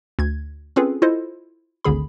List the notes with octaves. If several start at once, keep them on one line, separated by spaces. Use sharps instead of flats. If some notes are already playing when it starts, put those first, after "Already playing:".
D2 G#6
C4 C#4 F4 G#4 A4 B4
E4 F4 A4 C5 D#5
G#1 D2 D3 G#4 B5